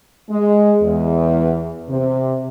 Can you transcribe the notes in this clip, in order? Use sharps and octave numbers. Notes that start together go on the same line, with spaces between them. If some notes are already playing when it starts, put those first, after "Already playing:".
G#3
E2
C3